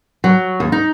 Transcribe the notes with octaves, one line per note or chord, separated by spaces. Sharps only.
F#3
D#2
D#4